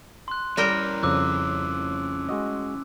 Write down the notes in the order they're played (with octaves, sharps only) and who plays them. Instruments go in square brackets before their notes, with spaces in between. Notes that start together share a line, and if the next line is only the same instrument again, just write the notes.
[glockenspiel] C6 F#6
[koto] G3 A#4 G5 [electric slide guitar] C#4 E4 C#5
[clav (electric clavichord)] F2 C#3 [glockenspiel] D6 E6 F#6
[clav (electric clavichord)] G#3 F#4 D#5